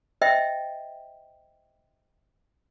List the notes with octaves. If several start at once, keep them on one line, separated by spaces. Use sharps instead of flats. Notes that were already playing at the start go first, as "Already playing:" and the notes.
C5 D#5 E5 G5